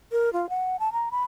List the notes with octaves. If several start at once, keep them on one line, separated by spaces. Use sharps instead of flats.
A#4
F4
F#5
A5
A#5
B5